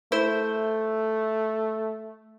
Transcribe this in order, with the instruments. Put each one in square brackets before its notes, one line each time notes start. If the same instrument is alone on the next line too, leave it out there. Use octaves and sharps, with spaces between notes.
[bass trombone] A3 [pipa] E4 C5